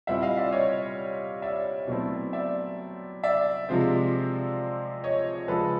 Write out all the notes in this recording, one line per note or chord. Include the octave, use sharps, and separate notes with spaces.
A#2 G3 C4 E4 E5 F#5
D#5 F5
D5 E5
C#5 D#5
D5 E5
B2 F#3 A3 C4 E4
D5 E5
D5 E5
C3 F3 G#3 C4
C#5 D#5
C#3 F3 G#3 A4 B4